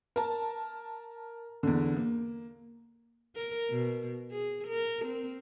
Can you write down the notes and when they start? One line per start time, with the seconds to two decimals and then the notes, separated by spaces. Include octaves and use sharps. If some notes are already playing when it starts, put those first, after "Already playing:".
0.16 A#4 A5
1.63 E2 D3
1.97 A#3
3.35 A#4
3.71 B2
4.31 G#4
4.68 A#4
5.05 C4